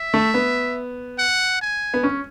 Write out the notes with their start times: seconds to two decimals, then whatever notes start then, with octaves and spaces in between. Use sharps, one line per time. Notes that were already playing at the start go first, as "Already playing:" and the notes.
Already playing: E5
0.14 A3
0.34 B3
1.19 F#5
1.61 G#5
1.94 B3
2.03 C#4